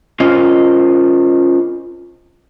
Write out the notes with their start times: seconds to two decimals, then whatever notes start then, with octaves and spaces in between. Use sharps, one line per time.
0.20 C#4 F4 A#4 C5 D#5